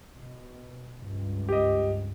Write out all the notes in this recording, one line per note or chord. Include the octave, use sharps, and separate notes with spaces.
B2
C#2 G2
G4 D#5